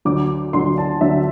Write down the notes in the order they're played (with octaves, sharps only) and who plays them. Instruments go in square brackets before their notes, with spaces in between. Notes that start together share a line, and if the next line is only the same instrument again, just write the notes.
[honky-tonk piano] D2 D3 F#3 D6
D2 D3 F#3 C6
A5
D2 D3 F#3 E5